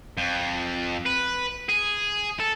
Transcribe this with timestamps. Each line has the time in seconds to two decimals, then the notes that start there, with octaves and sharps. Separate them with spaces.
0.18 F2
1.06 B4
1.69 G#4
2.40 A4